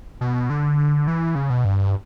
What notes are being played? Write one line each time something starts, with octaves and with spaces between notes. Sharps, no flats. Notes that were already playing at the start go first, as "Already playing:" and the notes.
B2
D3
E3
C#3
B2
G2